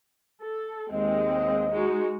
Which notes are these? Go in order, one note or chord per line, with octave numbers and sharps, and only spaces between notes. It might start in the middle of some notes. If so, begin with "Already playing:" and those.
A4
D#2 G#3 C4 D#5
G#3 D#4 F#4